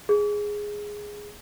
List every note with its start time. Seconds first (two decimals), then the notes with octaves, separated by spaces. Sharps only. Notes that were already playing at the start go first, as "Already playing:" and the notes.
0.09 G#4